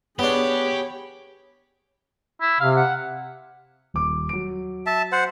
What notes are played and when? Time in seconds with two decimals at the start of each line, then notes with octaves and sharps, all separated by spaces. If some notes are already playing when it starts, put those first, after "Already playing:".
0.19 B3 D4 G4 G#4 C#5 B5
2.41 E4
2.61 C3 F5
2.77 F#5
3.94 D#1 D6
4.29 F#3 D7
4.86 E5 A5
5.12 C5 F#5